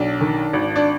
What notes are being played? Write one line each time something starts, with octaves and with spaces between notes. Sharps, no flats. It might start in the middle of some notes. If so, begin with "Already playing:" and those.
Already playing: B1 D4
D#3
G#1
D4